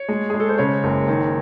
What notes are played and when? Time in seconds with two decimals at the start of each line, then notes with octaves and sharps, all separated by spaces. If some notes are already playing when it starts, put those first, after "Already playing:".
Already playing: C#5
0.08 G#3
0.30 G#3 G#4
0.40 A4
0.49 C5
0.58 C#3 C#5
0.84 F#1
1.08 D#3